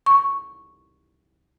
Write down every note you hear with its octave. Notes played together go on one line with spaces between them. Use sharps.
C#6